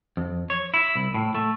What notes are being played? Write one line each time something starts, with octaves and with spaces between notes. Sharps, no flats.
F2
C#5
E4
C2
A2
A3